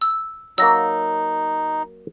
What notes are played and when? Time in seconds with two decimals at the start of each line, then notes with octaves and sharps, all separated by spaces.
0.01 E6
0.58 F#3 A#3 D#4 E6 A#6